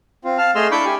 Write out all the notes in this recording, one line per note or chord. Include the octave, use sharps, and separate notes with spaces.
C4 F4
F5 A5 F6
A3 G#4 D#5 C6 E6 F6
D4 E4 B5 C#6 D6 G6
G4 G#5